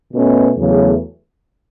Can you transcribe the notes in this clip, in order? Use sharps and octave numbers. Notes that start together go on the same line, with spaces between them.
B2 A3 C#4
E2 C#3 F#3 A3